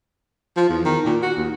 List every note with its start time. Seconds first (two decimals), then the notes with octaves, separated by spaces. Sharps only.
0.57 F3
0.69 E2
0.85 D#3
1.05 A#2
1.22 F#4
1.37 D#2